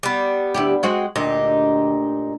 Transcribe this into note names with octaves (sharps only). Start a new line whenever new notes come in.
G3 B3
D2 E4 G4
G#3 C4 F#4
D2 A#2 D#4 G4